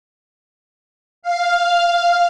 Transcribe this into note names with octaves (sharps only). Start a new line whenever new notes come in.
F5